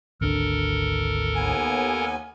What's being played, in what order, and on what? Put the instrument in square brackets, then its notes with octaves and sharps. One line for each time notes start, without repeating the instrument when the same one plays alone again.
[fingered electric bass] G#1 D2 D4 [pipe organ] A4 A#4
[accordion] D#2 B3 G#5